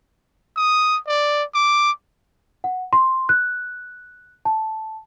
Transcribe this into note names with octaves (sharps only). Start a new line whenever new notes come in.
D#6
D5
D6
F#5
C6
F#6
A5